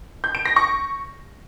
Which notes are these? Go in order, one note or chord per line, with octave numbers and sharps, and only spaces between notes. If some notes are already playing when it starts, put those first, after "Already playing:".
G6
D7
A#6
C#6